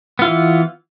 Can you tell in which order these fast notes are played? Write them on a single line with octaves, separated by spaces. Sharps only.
B3 F4 E4 E3